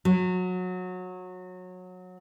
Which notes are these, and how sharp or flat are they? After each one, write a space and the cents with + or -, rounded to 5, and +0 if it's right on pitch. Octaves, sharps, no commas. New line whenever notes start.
F#3 -20